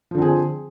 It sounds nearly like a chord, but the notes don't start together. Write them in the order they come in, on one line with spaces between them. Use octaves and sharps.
F3 D3 C4 G#4